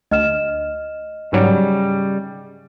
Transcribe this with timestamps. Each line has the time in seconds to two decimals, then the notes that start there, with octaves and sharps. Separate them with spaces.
0.11 D2 D#5 F6 E7
1.33 G#2 C#3 F#3 G3